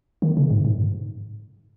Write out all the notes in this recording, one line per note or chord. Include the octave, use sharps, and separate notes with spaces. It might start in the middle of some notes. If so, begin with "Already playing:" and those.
D#3
C#3
G#2
G#2